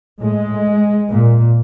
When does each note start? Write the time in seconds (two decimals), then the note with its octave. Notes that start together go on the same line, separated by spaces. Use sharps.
0.21 A2 G#3
1.10 A#2